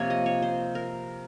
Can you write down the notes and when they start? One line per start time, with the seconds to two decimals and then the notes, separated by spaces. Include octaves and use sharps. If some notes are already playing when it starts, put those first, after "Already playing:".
Already playing: C3 F3 A#3 C#5
0.10 D#5
0.26 C#5
0.42 C5
0.75 A#4